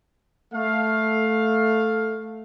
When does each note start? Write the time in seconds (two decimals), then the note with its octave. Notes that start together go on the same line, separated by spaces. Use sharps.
0.54 A3 F5